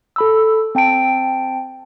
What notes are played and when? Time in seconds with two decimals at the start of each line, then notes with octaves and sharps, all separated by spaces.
0.16 A4 B5 E6
0.75 C4 G5 A5 D7